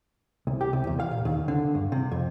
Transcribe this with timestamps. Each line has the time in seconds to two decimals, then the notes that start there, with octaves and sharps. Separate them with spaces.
0.47 C2
0.61 G4
0.73 C2
0.87 E2
1.00 F5
1.11 A#2
1.25 D#2
1.48 D3
1.75 G2
1.92 C3
2.12 F2